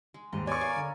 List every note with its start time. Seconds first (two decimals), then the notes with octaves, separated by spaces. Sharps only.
0.14 G#3
0.32 D#2 G#2 D#5
0.47 B3 C#5 D5 G#5 C#6
0.61 A#4 F5
0.76 D3